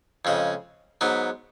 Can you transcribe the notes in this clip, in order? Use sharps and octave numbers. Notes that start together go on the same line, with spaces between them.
F2 C#3 G#3
G#2 F#3 B3